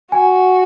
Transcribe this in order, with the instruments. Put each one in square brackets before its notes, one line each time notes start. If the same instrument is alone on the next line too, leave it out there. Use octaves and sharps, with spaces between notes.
[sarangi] F#4 [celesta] G#5